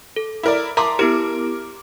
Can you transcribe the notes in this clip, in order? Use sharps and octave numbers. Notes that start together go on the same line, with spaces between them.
A4
E4 A#4 D5
A#4 E5 A5 A#5 C6 D6
B3 E4 G4 A#4